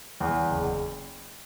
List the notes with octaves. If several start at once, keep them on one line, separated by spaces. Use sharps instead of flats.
E2
F#1